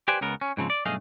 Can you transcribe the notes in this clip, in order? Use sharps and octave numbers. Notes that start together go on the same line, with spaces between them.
G4 B4 C5 D5 G#5
C#2 C#3 B3 A#4
C#4
G#2 C#3 F3 C4
D5
B1 G2 A3 G#4 D#5 F5